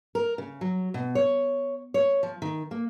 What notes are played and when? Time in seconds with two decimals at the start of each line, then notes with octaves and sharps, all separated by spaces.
0.15 A#4
0.38 C#3
0.61 F#3
0.94 B2
1.15 C#5
1.94 C#5
2.23 F3
2.42 D#3
2.71 A#3